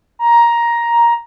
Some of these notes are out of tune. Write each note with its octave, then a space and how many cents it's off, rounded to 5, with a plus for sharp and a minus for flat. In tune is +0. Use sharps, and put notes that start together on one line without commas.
A#5 +10